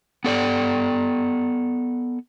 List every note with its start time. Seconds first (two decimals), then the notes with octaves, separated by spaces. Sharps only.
0.24 B3 A4 D5